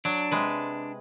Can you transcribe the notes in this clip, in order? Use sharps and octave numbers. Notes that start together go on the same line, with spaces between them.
F#3 D4
C3 G#3 B4